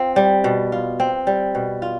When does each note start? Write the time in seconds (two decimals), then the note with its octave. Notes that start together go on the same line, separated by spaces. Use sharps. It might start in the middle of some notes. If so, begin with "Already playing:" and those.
Already playing: C4 F4
0.16 G3
0.44 B2
0.72 F4
1.00 C4
1.27 G3
1.55 B2
1.82 F4